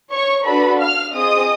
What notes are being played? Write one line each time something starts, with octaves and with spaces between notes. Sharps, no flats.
C#5 C#6
D4 F#4 A4 B4 B5
F5 F6
C4 F4 G#4 D#5 D#6